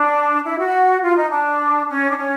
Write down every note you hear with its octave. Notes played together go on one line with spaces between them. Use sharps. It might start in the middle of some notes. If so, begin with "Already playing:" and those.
Already playing: D4
E4
F#4
F4
D#4
D4
C#4
D4
C#4